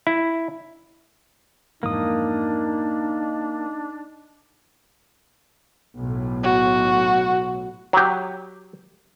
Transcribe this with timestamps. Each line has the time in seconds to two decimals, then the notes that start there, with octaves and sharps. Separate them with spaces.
0.07 E4
1.83 F2 G#2 E3 A#3 D4 D#4 D#6
5.99 B1 A2
6.43 F#4
7.93 F#3 G4